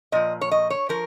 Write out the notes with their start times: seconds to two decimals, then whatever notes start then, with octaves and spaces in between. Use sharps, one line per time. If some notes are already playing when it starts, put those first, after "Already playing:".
0.12 A#2 F3 D#5
0.41 C#5
0.51 D#5
0.70 C#5
0.89 F3 A#4